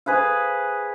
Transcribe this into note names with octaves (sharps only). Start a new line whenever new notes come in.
G#4 B4 C5 F5